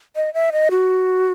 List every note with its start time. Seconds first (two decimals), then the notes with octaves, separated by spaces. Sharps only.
0.16 D#5
0.34 E5
0.52 D#5
0.71 F#4